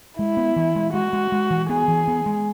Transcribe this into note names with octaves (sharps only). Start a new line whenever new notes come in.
G#3 E4
B3
E3
G#3
G#3 F#4
G#3
G#3
E3
B3 G#4
E3
B3
G#3